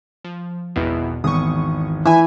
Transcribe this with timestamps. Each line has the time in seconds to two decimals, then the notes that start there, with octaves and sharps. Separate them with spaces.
0.24 F3
0.76 G#1 E2 B2 B3 E4
1.24 G#1 E2 C#6 D#6
2.05 E3 E5 G#5